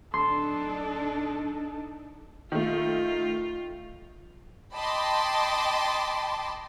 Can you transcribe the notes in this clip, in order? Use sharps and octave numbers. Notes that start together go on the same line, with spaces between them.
D1 D4 D#4 A4 C6
D#3 A3 F4
D#5 G5 A5 B5 C6 D6